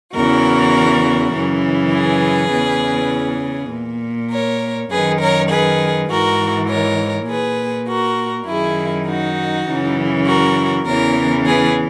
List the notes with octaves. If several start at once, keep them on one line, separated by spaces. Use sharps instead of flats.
E2 C#3 E3 F#4 A#4
F#2 C#3 E3
G#4 B4
E2 C#3 E3
A#2
A#4 C#5
F#2 D#3 G#4 B4
A#4 C#5
G#4 B4
G#2 E3 F#4 A#4
A#4 C#5
A#2 G#4 B4
F#4 A#4
F#2 D#3 E4 G#4
D#4 F#4
F#2 C#3 E3
F#4 A#4
E2 C#3 E3 A#4 C#5
G#4 B4